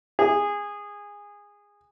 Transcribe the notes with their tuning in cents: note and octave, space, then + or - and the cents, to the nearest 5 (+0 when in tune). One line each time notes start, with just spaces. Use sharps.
G#4 -20